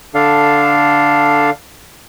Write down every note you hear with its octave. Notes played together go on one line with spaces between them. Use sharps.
D3 D4 A4 F5